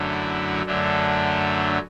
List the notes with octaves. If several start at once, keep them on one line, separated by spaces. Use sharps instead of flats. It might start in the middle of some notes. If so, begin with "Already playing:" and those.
Already playing: F#2 D3 F#3 A3
E4
F#2 D3 F#3 A3 D4